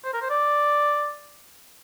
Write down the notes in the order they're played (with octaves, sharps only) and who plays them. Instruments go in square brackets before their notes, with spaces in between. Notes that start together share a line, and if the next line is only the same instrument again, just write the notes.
[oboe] C5
A#4
C5
D5